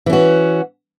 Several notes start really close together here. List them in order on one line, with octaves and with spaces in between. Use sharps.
E3 C#4 F#4